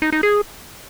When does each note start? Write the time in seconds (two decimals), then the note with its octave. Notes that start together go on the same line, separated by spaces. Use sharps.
0.02 D#4
0.12 D#4
0.23 G#4